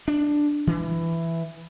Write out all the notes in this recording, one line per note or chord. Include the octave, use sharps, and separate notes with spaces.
D4
E3